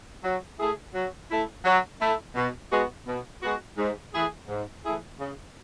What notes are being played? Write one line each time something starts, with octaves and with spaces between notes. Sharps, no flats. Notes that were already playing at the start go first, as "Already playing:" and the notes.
F#3
A3 E4 G#4
F#3
A3 E4
F#3
A3 E4
B2
G#3 B3 F#4
B2
G#3 B3 F#4
G#2
E3 A3 E4 G#4
G#2
E3 A3 E4 G#4
C#3